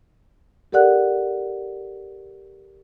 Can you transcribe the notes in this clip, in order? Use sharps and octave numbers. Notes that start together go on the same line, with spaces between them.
G4 A4 A#4 D5 F#5 F#6